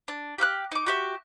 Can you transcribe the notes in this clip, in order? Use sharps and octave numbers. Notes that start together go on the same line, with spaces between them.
D4
G4 F5 D6 F#6
D#4 D6
F#4 G4 E5